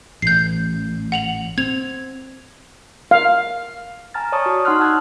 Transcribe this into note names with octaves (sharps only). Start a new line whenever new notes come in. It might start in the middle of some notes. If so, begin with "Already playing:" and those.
A1 G6 C7
F#5 F7 F#7
C4 G#6 F7
F5
G#5 A#5 F6 A6
C#5 D5 A5 C#6 D#6
F#4
D#4 F#5 C6 D#6 F6 F#6
F#5 A5 E6 F#6 G#6